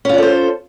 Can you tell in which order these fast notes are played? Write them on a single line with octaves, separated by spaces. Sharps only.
C#4 F4 D5 A4 C5